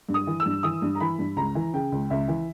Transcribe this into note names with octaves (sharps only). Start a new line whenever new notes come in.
G2
D#6
E3
E6
G2
E3 D#6
G2
A#5
E3 B5
G2
C#2 A#5
E3
C#3 G5
C#2
C#2 E5
E3